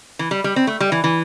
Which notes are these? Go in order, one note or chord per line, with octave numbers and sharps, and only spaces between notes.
E3
G3
G3
C4
A3
G3
E3
E3